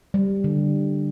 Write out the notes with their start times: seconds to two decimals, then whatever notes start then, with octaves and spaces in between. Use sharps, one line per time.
0.14 G3
0.44 D3